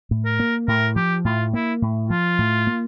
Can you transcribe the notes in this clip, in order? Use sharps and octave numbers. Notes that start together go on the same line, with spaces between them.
A2
A#4
A#3
A2 A#4
F3 G4
A2 F4
A#3 E4
A2
F3 F4
A2
A#3